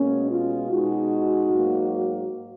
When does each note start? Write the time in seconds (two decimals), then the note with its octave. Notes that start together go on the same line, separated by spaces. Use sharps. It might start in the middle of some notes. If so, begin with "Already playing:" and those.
Already playing: B2 G#3 A#3 C#4
0.31 C#4 F4
0.71 B2 G#3 D#4 F#4
1.51 G#2 F#3 A#3